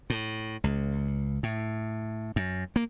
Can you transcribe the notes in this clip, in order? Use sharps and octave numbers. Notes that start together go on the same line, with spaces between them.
A2
C#2
A2
F#2
A#3